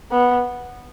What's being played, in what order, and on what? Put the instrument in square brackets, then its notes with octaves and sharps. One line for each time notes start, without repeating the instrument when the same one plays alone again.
[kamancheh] B3